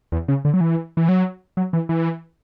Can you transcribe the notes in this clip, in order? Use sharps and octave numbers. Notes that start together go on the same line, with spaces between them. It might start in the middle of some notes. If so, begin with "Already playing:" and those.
E2
C#3
D3
F#3
E3
E3
F#3
F#3
E3
E3